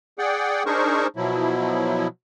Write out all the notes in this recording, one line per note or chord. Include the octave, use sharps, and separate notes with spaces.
G#4 D5 F#5 G5
D4 D#4 G#4 A#4 C5 C#6
B2 F3 F#3 E4